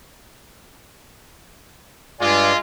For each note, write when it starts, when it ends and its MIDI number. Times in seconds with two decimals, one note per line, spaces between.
2.20 2.52 43
2.20 2.57 56
2.20 2.57 65
2.20 2.52 74
2.20 2.52 80